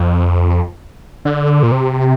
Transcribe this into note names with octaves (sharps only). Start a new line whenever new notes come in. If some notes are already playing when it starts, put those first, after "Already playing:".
Already playing: F2
D3
A#2
C3